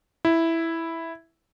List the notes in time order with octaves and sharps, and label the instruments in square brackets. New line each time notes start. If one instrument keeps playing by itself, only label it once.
[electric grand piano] E4